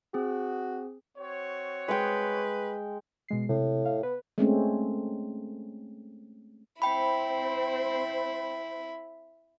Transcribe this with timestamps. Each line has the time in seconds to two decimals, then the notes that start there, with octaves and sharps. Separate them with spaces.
0.14 C4 F#4 G#4
1.18 C4 F#4 C#5
1.88 G#3 B4 G5
3.29 B2 G#3 C7
3.49 A2 C3
3.85 F5
4.03 B3 B4
4.38 G#3 A3 C4 C#4
6.82 C4 E4 C5 G5 B5